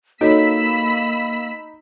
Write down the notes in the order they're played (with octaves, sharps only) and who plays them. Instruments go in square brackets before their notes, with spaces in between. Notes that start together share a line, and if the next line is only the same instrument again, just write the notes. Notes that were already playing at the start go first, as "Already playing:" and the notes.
[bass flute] A#3 [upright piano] D#4 [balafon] F#4 A4 C#5 [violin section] B5 E6 B6